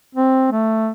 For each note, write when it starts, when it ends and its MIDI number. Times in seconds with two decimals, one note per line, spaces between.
0.15 0.50 60
0.52 0.90 57